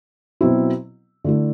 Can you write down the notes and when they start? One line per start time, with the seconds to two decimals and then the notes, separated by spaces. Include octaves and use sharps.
0.41 B2 F#3 C4 E4
1.24 D3 A3 E4